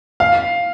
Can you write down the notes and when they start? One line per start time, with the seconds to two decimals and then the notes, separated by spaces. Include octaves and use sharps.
0.20 F5